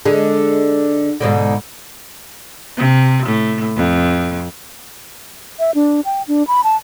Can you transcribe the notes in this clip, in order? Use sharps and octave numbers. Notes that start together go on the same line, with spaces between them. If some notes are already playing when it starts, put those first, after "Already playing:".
D3 G#3
G#2 B2 D3
C3
A2
F2
E5
D4
G5
D4
B5
A5